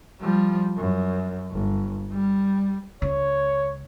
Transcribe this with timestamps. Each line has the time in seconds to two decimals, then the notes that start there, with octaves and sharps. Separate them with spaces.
0.20 F3 G3
0.78 F#2
1.52 G1
2.11 G3
3.02 C#2 C#5